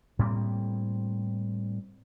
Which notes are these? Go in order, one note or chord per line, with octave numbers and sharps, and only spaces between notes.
A2 G3 A#3 C4